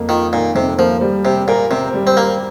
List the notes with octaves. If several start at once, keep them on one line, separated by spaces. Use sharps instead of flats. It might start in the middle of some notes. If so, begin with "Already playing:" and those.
Already playing: F2 A#3
D#3 F4
A#2 D#3
F2 C3
F3 A#3
G3
C3 G4
A#2 A#4
C3 C4
G3
C4
A#3 G4